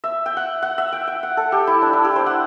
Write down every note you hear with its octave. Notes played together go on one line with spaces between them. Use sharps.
E5
G5
F#5
F#5
E5
G5
G5
F#5
A4
G4
E4
D4
E4
G4
C5
F#5